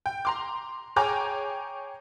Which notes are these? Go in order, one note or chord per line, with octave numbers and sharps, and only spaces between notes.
G5
A#5 C6 D6
G#4 C#5 G5 G#5 A#5 D6